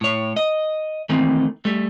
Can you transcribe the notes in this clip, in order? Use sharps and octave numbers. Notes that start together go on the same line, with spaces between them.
A2 C#5
D#5
D#3 E3 A3 A#3 C4
G3 A3